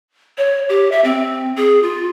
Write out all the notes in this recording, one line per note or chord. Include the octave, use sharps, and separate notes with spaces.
C#5
G4
E5
C4
G#4
F4